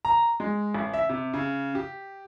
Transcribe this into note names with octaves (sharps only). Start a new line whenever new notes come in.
A#5
G#3
A1
E5
C3
C#3
G4